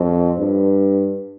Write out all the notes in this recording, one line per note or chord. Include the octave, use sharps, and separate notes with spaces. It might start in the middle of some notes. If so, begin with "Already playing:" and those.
Already playing: F2
G2